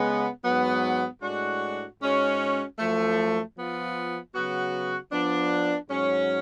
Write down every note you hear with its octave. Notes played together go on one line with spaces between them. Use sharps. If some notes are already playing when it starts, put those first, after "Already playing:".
Already playing: C#3 G#3 B3
G#2 F#3 B3
A2 G#3 D4 F#4
G#2 G#3 C#4 F#4
F#2 F3 A3
F3 B3 F4
C#3 F#3 B3 F#4
F3 B3 D4
G#2 F#3 C#4